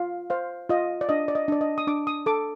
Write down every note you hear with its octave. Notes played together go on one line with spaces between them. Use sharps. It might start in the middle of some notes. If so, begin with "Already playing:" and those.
Already playing: F4 F5
C5 F5
F4 D#5
D5
D4 D#5
D5
D#5
D4 D5
D#5
D#6
D4 D6
D#6
A4 D6